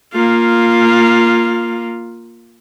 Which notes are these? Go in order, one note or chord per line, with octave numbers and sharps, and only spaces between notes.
A#3 F4